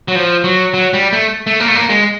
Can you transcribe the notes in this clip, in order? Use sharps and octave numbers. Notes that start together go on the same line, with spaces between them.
F#3
F3
F#3
F#3
G3
A3
A3
A#3
A3
A#3
G#3